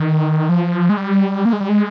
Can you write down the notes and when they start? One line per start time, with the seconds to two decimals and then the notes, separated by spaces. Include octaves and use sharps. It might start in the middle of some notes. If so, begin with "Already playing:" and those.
Already playing: D#3
0.49 F3
0.89 G#3
0.97 G3
1.45 A#3
1.53 G#3
1.60 G3
1.69 G#3